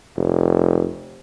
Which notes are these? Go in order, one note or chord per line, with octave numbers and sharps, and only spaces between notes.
F1